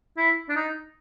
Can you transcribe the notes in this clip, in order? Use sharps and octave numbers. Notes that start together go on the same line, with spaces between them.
E4
D4
D#4